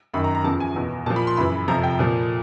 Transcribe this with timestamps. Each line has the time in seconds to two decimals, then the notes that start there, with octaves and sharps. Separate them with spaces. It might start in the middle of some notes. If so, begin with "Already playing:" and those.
0.14 F#2 D#3 B5
0.24 A#5
0.35 A#5
0.44 E2 C#3 F3 A5
0.60 G#5
0.76 E2 B2
1.06 A#2 A5
1.10 F3
1.16 B5
1.27 C6
1.37 F#2 C#3 E3 B5
1.68 F2 C3 F3 A#5
1.84 G5
1.99 A#2 F3